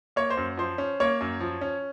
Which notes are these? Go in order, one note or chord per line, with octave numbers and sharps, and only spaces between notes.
A#3 C#5
C5
F#2
F3 C5
C#4
A#3 C#5
F#2
F3
C#4